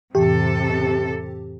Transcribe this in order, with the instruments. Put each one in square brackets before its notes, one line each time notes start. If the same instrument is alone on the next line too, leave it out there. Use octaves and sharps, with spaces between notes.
[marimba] F2 A2 E3 [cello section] C3 A4 [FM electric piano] G4